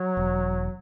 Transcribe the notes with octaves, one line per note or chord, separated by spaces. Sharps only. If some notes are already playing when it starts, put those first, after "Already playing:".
Already playing: F#3
E1